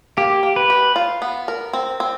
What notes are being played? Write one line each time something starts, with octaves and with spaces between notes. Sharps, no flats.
A#3 G4
A#3
B4
G4
F4
B3
A#4
C4
C4